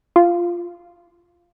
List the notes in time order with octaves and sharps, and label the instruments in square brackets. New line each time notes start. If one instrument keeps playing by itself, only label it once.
[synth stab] F4